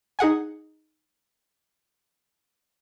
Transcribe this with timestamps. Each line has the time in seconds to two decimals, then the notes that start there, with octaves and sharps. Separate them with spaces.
0.19 D#4 G#4 F#5 G#5